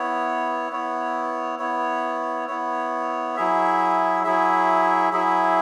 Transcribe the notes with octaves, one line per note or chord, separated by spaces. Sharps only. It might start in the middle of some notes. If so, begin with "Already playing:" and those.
Already playing: B3 E4 C#5
B3 E4 C#5
B3 E4 C#5
B3 E4 C#5
F#3 E4 G#4 E5
F#3 E4 G#4 E5
F#3 E4 G#4 E5